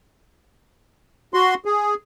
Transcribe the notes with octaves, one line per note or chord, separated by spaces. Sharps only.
F#4 C6
G#4